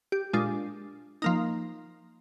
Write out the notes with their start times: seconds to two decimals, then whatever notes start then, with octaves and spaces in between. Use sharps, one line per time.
0.12 G4
0.33 A#2 G#3 D4 F4
1.22 F3 A#3 D#4